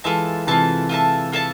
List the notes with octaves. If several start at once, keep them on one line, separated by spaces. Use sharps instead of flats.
E3 G#3 F4 A4 E5 A5
C3 E3 F4 A4 E5 A5
F4 A4 E5 A5
F4 A4 E5 A5